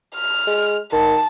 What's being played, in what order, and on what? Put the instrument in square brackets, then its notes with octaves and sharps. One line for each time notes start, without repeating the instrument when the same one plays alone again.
[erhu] F6
[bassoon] G#3
[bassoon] D#3 [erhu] A5